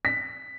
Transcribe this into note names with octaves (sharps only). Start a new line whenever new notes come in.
B6